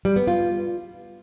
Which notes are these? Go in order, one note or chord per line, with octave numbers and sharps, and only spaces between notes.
G3
B3
F4